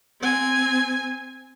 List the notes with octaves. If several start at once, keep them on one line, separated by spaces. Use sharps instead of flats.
C4 G#5